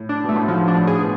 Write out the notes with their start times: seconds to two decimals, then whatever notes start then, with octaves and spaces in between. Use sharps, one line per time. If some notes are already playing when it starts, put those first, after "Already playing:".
Already playing: A2
0.09 D4
0.24 B2
0.29 A3
0.36 A2
0.48 G#2 F3
0.68 D4
0.74 A2
0.87 G#4
1.00 B2